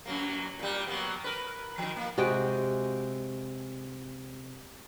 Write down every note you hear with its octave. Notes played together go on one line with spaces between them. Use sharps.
F#2 F#3 A#3
A#2 G3
F#3 A#3 B3
A#4 B4
D#3 F3
A#3
C3 G#3 F#4 G5